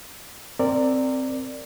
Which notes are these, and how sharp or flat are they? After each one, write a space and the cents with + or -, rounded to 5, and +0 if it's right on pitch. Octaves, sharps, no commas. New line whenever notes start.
C4 +0 A#4 -20 D5 +0